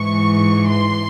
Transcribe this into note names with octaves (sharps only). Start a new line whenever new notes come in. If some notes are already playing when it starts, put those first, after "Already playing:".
Already playing: G#2 E3 C#6
C6